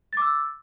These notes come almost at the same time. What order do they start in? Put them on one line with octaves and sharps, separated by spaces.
A6 D6 E6